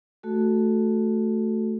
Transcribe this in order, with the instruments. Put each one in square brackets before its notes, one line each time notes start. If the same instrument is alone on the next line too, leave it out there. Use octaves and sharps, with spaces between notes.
[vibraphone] A3 F#4 A4